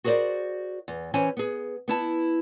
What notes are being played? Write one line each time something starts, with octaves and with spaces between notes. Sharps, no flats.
F#4 G#4 A#4 C5 D5
E2
E3 C#4 C5 G#5
B3 G#4
B3 E4 A5